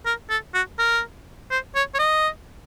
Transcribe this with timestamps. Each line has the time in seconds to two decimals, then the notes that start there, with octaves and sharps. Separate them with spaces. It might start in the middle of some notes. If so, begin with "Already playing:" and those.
0.06 A#4
0.30 A4
0.54 F#4
0.78 A#4
1.51 C5
1.75 C#5
1.94 C#5
1.99 D#5